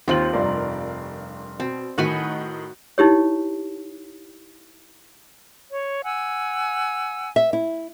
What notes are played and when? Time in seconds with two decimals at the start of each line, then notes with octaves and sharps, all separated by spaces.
0.08 D#2 D#3 C4 F4 C5 F#7
0.33 F1 G2 A#4 D5 C6
1.60 B2 C4
1.98 A2 D#3 D#4 F#4 B4 G#5
2.98 D#4 E4 G4 C#5
5.70 C#5
6.04 F#5 G#5 E6
7.36 E5
7.53 E4